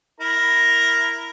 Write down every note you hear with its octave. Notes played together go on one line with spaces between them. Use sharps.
E4 A#4 A#5